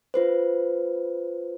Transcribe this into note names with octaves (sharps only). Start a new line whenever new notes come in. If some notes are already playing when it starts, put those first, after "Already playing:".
F4 B4 C5